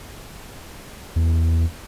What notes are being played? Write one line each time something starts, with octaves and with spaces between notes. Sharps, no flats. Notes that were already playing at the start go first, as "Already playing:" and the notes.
E2